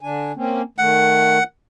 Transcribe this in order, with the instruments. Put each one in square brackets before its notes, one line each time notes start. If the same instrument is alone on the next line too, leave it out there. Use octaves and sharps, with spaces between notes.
[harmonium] D3 D4 G#5
A#3 C4 C#4
[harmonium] D#3 A3 [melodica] F#5